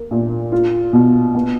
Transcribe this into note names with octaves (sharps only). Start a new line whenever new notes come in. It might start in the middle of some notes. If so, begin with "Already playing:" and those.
Already playing: A#3
A#2
F4
B2
B3